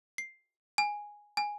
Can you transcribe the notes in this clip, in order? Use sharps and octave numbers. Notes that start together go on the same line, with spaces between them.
C7
G#5
G#5